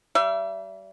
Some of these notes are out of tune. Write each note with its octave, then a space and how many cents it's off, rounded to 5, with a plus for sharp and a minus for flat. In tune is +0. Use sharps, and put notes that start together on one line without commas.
G3 -30 E5 +30